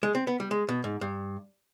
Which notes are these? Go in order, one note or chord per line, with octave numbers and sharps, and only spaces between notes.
G#3
C4
B3
G3
G#3
B2
G#2
G2